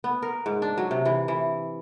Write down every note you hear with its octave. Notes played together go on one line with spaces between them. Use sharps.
B3
A#4
G#2
D4
F#3
C3
E3
E3